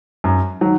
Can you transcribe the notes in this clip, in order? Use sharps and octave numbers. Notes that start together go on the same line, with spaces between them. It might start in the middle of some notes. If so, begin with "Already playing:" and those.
F#2
D#3 F#3